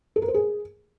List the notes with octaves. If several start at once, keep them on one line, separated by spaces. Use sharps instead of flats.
A4
A#4
C5
G#4